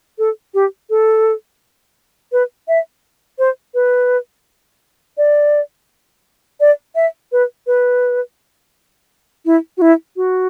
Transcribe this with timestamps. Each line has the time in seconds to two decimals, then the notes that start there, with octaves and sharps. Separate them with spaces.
0.18 A4
0.54 G4
0.90 A4
2.32 B4
2.68 E5
3.39 C5
3.74 B4
5.17 D5
6.60 D5
6.95 E5
7.32 B4
7.67 B4
9.45 E4
9.77 F#4
9.82 E4
10.16 F#4